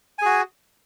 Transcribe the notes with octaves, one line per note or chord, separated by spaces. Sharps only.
F#4 G#4 G#5